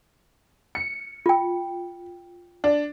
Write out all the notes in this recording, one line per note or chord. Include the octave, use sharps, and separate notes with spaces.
C#7
F4 G5
D4